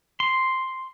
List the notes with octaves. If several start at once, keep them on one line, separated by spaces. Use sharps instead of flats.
C6